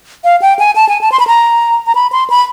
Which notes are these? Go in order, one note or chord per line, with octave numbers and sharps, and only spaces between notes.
F5
G5
G#5
A5
G#5
A5
C6
B5
A#5
A#5
B5
C6
B5